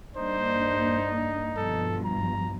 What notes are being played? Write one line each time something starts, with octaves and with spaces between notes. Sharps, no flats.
G2 A#3 D4 D#4 C5
G2 B2 F3 A4
A#5